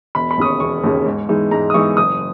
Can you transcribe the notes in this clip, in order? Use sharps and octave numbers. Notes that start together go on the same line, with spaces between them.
E1 B5
B5
D#2 C#3 D#6
C#6
E1 C#6
D#2 C#3
G#2
E3 G#3 D#4
G#2 A#5
D#6
E3 G#3 D#4 C#6
F#1 D#6